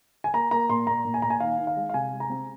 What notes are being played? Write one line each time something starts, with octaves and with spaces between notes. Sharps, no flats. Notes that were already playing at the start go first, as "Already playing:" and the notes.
G#5
A#3 A#5
A#3 A#5
A#2 C6
A#2 A#5
A#2
G#5
A#2 A#5
G#5
D#3 F5
D#3
F5
G#3
F5
C3 G#5
G#3
A#5
C4